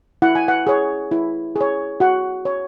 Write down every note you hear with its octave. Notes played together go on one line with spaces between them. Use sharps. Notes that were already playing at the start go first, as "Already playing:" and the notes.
E4 F#5
G#5
F#5
G#4 C#5
E4
G#4
C#5
F#4 F#5
C#5